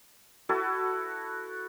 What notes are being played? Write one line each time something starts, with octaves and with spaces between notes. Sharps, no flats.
E4 F#4 A4 B4